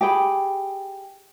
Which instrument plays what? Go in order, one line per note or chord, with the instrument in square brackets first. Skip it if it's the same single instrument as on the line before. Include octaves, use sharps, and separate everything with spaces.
[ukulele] G4 G#4 G5 B5